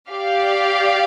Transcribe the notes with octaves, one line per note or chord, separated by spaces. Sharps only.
G4 D5 F5